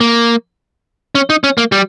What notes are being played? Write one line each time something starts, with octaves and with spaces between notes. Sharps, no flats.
A#3
C#4
D#4
C#4
A#3
G3